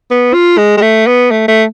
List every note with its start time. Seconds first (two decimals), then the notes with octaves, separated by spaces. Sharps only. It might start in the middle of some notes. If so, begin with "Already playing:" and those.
0.11 B3
0.34 F4
0.58 G#3
0.77 G#3
0.82 A3
1.07 B3
1.31 A3
1.48 A3